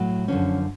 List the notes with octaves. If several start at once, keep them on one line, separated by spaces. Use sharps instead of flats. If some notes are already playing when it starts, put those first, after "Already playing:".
Already playing: A2 F#3
F#2 D3 F3 C#4